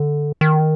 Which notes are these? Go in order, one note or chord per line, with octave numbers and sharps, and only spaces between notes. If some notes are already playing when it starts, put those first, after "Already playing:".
Already playing: D3
D#3